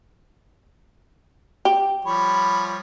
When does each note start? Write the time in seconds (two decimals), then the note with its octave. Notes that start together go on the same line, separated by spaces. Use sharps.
1.65 G4
2.05 F3 G3 C#5 B5